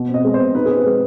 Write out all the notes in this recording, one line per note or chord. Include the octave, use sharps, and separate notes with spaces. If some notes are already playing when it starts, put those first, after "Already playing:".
Already playing: B2
C4
D#5
G#3
C5
B2
D#4 B4
G#4
C4
B4
G#3